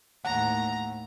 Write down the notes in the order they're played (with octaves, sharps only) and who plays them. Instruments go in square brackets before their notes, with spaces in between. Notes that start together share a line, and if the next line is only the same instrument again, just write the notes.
[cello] D#2 A2 [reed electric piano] F#5 [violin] A#5